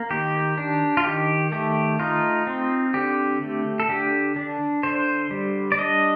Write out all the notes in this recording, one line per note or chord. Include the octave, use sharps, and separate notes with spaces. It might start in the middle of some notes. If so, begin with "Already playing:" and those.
Already playing: A#3
D#3 G4
D4
F4
D#3 G4
A3 G4
D#4 F4
C4
D3 G4
A3
A4
D3 G4
D4
D3 C5
G3
D5
D4 D#5